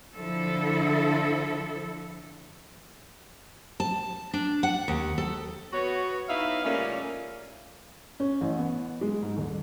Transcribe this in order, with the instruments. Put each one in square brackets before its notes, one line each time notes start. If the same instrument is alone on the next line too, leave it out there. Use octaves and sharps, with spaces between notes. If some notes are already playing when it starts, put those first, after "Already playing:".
[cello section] D3 F3 E4 A4
[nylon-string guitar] A5
D4
F#5
D#2
A4
[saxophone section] B3 F#4 C#5
B3 D#4 E4 E5 F5
A#2 C#3 G3 A3 A#3 C#4
[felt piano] C#4
A1
B3
G#3
G#2
D#1